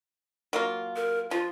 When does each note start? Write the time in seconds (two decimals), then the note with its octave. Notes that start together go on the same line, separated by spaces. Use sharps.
0.53 F#3 A#3 F4
0.96 A#4
1.31 F3 F4